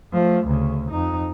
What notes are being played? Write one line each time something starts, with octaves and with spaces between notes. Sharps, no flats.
F3 A3
D2 C#3
F2 D#4